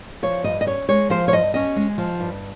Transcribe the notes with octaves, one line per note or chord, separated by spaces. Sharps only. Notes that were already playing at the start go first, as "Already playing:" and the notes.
F3 C#5
G2 D#5
D#5
C#4 C#5
G#3 C#5
F3 C5
C#5
G2 D#5
C#4 D#5
G#3
F3
G2